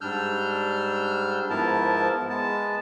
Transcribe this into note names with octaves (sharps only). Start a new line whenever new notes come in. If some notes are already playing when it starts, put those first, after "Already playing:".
G#2 G3 D4 E6 F6 G6
G#2 F3 B3 E4 A#4 A5
G#3 B3 A5